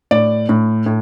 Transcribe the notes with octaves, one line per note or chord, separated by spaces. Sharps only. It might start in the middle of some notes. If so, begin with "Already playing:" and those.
A2 D5
A2
A2